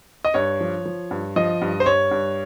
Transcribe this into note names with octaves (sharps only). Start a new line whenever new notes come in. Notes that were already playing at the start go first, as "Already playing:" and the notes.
D#5
G2 C#5
F3
F3
G2
F3 D#5
G2
C5
G2 C#5
G2